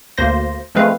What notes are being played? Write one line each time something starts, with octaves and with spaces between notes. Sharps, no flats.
D2 A#3 C5 C6 A#6
F3 G#3 A3 C4 B4 F5